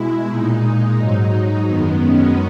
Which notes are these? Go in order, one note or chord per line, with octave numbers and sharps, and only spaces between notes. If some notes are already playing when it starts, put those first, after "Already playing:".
Already playing: B2 G#3 E4
A#2 G#3 D#4
G#2 F#3
F#2 D#3 G#3 B3
C#4